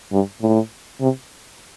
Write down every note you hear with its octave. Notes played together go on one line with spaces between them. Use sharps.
G2
A2
C3